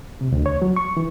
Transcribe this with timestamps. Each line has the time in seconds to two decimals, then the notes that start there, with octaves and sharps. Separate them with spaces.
0.21 C3
0.32 D2
0.46 C#5
0.62 F#3
0.77 C#6
0.97 E3